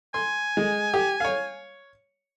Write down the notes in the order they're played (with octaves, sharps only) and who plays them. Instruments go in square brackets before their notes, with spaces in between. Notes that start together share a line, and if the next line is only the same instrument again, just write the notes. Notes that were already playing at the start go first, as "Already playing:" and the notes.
[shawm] G#5 [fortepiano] C6
[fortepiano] G#3
G4
C#5 F5